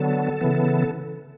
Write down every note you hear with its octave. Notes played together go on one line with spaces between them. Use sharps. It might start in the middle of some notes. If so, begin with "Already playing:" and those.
Already playing: D3 F#3 B3 A4
C#3 E3 B3